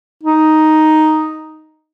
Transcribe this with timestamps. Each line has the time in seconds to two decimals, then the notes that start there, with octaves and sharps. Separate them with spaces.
0.23 D#4